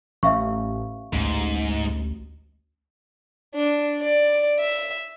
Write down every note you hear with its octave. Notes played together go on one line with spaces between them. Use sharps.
A1 E5 F5 C#6
A1 D2 G#2
D4
D5
E5